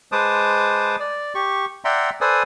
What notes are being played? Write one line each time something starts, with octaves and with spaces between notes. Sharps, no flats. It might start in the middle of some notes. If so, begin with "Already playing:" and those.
G#3 B4 C5 A5 D6 D#6
D5
G4 C#6
D5 E5 F#5 G5 A#5 C6
A4 B4 C5 D5 G#5 D#6